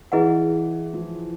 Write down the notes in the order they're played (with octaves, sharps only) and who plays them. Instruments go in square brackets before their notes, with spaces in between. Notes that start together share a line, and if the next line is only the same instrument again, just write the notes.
[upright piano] E3 [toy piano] E4 G#4 B4 D#5 F#5
[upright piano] F3